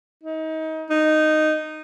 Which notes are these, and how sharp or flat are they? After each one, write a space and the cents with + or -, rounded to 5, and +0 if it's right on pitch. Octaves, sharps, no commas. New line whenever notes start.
D#4 +30
D#4 -10